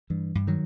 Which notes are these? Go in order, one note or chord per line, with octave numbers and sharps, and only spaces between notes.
G2 E3
G2
D#3 F#3